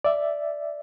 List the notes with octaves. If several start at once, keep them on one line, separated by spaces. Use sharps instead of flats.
D5 E5